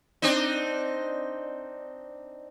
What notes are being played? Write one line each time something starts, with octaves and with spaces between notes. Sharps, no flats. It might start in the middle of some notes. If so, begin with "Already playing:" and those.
C4 D4 D#4